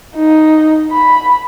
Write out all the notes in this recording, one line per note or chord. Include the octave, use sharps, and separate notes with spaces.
D#4
B5